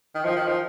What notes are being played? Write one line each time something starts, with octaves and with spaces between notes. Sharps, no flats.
D#3
F3
D#3
F3